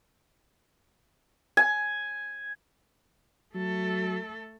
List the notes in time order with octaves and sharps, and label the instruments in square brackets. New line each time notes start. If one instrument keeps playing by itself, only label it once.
[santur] G#5
[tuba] F#3 [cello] A3 A4